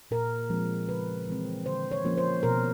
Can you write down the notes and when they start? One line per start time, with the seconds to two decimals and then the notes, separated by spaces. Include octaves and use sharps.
0.11 A#2 A#4
0.50 F3 G#3 C4
0.88 C#3 B4
1.28 E3 G#3 C4
1.66 D3 C5
1.91 C#5
2.04 F3 A#3 C#4
2.18 C5
2.43 B2 A#4